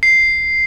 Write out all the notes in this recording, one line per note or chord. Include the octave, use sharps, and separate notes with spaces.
C7